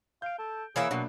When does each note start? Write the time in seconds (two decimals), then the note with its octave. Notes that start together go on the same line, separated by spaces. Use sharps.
0.22 F5 G6 D7
0.39 A4
0.76 E3 A#3 G#4 C#5 E5
0.91 B2 F#3 A#3 D4